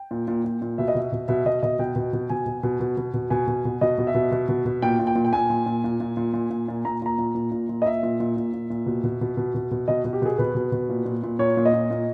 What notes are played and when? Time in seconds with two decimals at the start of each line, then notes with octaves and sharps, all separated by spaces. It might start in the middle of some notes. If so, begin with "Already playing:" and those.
Already playing: G5
0.11 A#2
0.28 A#2
0.44 A#2
0.62 A#2
0.78 B2 E5
0.88 D#5
0.95 B2 E5
1.12 B2
1.28 B2 E5
1.46 B2 D#5
1.63 B2 D#5
1.79 B2 G5
1.96 B2
2.13 B2
2.29 B2 G#5
2.46 B2
2.63 B2
2.80 B2
2.97 B2
3.14 B2
3.30 B2 G#5
3.47 B2
3.65 B2
3.81 B2 D#5
3.98 B2
4.07 E5
4.14 B2
4.31 B2
4.49 B2
4.65 B2
4.82 A#2 G5
4.99 A#2
5.07 G5
5.15 A#2
5.25 G5
5.33 A#2 G#5
5.50 A#2
5.66 A#2
5.84 A#2
6.00 A#2
6.17 A#2
6.33 A#2
6.50 A#2
6.68 A#2
6.85 A#2 A#5
7.02 A#2 A#5
7.19 A#2
7.35 A#2
7.52 A#2
7.69 A#2
7.82 D#5
7.86 A#2 E5
8.03 A#2
8.20 A#2
8.37 A#2
8.53 A#2
8.70 A#2
8.86 B2
9.04 B2
9.21 B2
9.37 B2
9.54 B2
9.71 B2
9.88 B2 D#5
10.05 B2
10.13 G4
10.22 B2 G#4
10.38 B2 B4
10.55 B2
10.72 B2
10.89 A#2
11.06 A#2
11.23 A#2
11.39 A#2 C#5
11.57 A#2
11.65 D#5
11.73 A#2
11.91 A#2